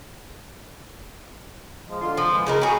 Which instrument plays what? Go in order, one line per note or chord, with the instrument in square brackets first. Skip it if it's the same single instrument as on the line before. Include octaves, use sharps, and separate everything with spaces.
[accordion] F3 G#3
D3 F4 C6
[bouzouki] F3
[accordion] G#3 B3
[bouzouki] C#3 D#4 A#4
[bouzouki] F#4 G#4 [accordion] G5 B5 C#6